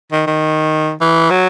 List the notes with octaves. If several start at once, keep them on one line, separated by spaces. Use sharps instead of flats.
D#3
D#3
E3
F#3